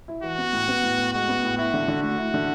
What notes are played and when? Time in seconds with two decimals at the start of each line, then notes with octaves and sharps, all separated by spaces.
0.08 E4
0.23 E3 F#4
0.38 B3
0.53 A2
0.68 B3
0.83 A2
0.98 A2
1.13 G#3 F#4
1.28 B3
1.43 A2
1.58 E4 F#4
1.74 D3
1.88 D3
2.03 A3 F#4
2.18 E4
2.34 D3